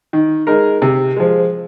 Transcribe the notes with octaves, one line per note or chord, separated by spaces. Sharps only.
D#3
G#3 D#4 A#4
C3
F3 G#3